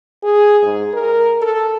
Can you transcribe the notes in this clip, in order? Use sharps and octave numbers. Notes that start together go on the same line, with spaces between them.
G#4
G#2
A#4
A4